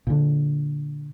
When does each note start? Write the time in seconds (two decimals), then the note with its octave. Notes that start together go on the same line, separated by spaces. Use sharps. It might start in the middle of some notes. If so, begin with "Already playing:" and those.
0.07 A#2 D3